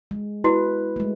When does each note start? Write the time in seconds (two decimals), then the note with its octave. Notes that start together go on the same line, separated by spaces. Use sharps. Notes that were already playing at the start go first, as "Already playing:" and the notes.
0.11 G#3
0.44 E4 F#4 B4
0.96 G#3 A3